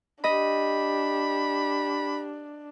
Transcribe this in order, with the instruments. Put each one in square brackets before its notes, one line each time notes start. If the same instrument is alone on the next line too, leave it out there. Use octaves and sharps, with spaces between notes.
[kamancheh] D4 [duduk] G4 [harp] D#5 [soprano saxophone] B5